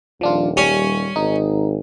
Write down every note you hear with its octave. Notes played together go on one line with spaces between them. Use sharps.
D#1 F3 D4 F4
G3 C#4
G#1 D#4